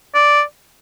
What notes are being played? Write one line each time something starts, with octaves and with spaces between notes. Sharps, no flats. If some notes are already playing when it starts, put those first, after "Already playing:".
D5